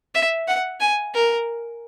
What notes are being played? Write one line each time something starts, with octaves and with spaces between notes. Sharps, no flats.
E5
F#5
G#5
A#4